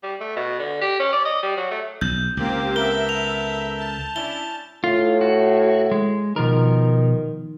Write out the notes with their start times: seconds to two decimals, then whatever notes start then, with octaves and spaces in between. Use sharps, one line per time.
0.03 G3
0.20 A3
0.36 B2
0.59 D3
0.81 G4
1.00 C#4
1.13 D5
1.25 D#5
1.43 G3
1.57 F#3
1.71 A3
2.01 B1 G6
2.37 C#2 A#3 C4 G4
2.76 B3 A4 A#4 E5 G7
3.09 F7
3.77 A5
4.16 C#4 D4 E4 G7
4.84 A2 F4
5.21 F#4
5.91 G#3
6.36 B2 D#3 F3 A#4